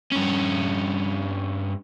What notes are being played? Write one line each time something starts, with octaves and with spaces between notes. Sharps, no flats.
G2 C#4